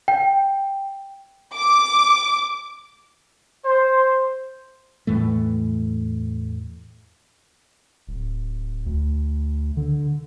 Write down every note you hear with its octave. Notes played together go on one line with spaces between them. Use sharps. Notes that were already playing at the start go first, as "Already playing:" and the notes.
G5
D6
C5
E2 A2 E3 A3
D1
D2
D3